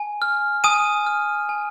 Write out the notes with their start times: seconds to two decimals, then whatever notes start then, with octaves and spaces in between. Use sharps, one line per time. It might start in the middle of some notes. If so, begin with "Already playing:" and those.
Already playing: G#5
0.22 F6
0.64 G#5 D#6 D#7
1.07 F6
1.49 G#5